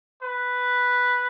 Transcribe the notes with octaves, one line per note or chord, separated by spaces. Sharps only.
B4